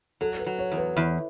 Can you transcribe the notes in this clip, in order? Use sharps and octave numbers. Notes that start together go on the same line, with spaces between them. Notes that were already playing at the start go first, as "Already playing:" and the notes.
F#3 A4
B4
F#3
C#5
E2
B4
E2